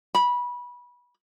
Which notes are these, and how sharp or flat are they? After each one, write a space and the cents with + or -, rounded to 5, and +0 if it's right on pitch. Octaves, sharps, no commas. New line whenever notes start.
B5 -20